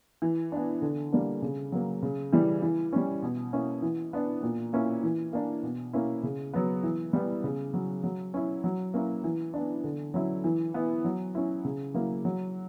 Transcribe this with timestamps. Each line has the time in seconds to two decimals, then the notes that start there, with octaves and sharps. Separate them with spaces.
0.22 E3
0.52 B3 D4
0.82 D3
1.12 G3 A#3 D4
1.42 C#3
1.72 F#3 A#3
2.03 C#3
2.33 E3 G3
2.62 E3
2.93 G3 C#4
3.22 B2
3.53 A#3 C#4 E4
3.82 E3
4.13 B3 D4
4.43 A#2
4.73 A#3 C#4 E4
5.03 E3
5.33 A#3 D4
5.63 B2
5.93 A#3 C#4 E4
6.23 C#3
6.54 F#3 B3
6.83 E3
7.13 G3 B3
7.44 C#3
7.74 F#3 C#4
8.04 F#3
8.34 C#4 E4
8.64 F#3
8.94 A#3 C#4 E4
9.24 E3
9.54 B3 D4
9.84 D3
10.14 F#3 C#4 E4
10.44 E3
10.74 B3 E4
11.05 F#3
11.35 C#4 E4
11.65 C#3
11.94 F#3 A#3 E4
12.25 F#3